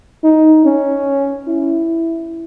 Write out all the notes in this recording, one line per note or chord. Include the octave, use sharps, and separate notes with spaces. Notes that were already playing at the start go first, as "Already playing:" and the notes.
D#4
C#4
E4